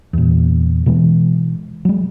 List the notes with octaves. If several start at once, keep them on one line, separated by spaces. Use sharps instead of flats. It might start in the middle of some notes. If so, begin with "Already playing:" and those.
E2 A#2
B2 E3 G#3
F#3 G#3